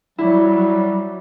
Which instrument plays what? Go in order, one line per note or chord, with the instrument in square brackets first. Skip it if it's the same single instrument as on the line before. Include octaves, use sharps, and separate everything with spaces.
[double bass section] F#3 [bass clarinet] G3 [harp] E4